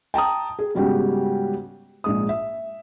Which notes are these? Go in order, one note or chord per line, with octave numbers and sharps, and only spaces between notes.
G5 A5 A#5 D#6
G#4
G#2 C#3 G3 B3 F#4 G4
A#1 G#2 D#6
E5